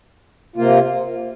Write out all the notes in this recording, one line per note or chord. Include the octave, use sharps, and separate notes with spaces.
C3 A#3 F4